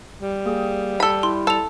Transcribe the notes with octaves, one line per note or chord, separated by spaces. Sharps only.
G3
A#3 G#4 G5
A4 B5
E4 C6
A4 A5 F7